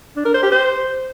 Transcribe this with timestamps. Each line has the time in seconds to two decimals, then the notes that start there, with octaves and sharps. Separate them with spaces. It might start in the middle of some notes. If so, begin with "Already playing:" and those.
0.16 D4
0.25 A#4
0.34 C5
0.43 G4
0.52 C5